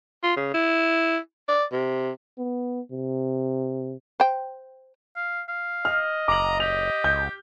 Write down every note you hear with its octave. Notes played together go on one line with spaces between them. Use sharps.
F4
C#3
E4
D5
C3
B3
C3
C5 G5
F5
F5
D#5 F6
F#1 A#5 D6 F#7
G4 F7
C#2 G6